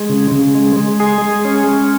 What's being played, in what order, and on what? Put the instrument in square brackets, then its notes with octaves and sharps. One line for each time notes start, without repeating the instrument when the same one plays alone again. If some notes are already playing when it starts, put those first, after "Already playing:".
Already playing: [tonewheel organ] G#3
C#3
C#3
G#3
G#3
G#4
G#3
C#4
G#3